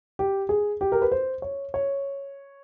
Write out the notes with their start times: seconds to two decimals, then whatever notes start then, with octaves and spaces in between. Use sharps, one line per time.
0.19 G4
0.49 G#4
0.81 G4
0.92 A#4
1.02 B4
1.12 C5
1.42 C#5
1.74 C#5